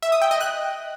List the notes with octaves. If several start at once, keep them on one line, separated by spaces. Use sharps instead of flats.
E5
D#6
G5
D#5
F#6